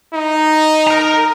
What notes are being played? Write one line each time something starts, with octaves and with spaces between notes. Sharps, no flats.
D#4
A#4 A#5